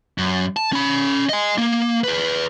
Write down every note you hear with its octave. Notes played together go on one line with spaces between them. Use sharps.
F#2
A5
C#4 B5
D#5 G#5
A#3
G#4 B4